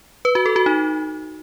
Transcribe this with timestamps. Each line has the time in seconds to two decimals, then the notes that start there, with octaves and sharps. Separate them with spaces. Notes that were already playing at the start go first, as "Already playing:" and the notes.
0.25 B4
0.35 F#4
0.46 A4
0.56 F#4
0.66 D#4